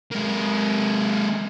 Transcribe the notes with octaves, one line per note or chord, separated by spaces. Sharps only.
G#3 A#3